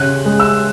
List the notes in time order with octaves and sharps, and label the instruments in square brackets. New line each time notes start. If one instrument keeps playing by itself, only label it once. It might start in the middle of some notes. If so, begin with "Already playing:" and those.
Already playing: [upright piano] C#3 [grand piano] F#6
[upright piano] G#3
[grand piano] E6